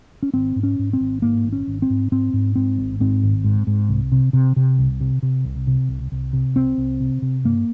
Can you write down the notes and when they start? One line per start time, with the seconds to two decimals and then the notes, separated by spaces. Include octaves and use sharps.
0.23 C#4
0.34 G#1 C4
0.56 G#2
0.63 C#4
0.79 G#2
0.93 C4
1.01 G#1
1.22 G#2 A#3
1.45 G#1
1.52 C#4
1.67 G#1
1.82 C4
1.90 G#2
2.12 G#2 C4
2.33 G#2
2.56 G#2 C4
2.78 G#1
3.00 G#2 C4
3.23 G#1
3.44 G#2
3.67 G#2
3.89 C2
4.12 C3
4.33 C3
4.56 C3
4.79 C2
5.00 C3
5.22 C3
5.45 C2
5.67 C3
5.89 C2
6.12 C2
6.33 C3
6.55 C2 C4
6.78 C2
7.00 C3
7.22 C3
7.44 G2 A#3